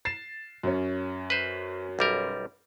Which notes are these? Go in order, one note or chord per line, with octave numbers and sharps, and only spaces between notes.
A6 C7 E7
F#2 C#4
B4 C5
B1 G3 A#4